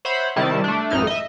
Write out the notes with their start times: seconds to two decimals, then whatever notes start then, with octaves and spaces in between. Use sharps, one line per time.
0.05 C5 C#5 E5 F#5 B5
0.36 C3 D#3 G3 E4 A5
0.64 A3 D4
0.90 A1 F#2 D#4 E4 F6
1.07 D#5 E5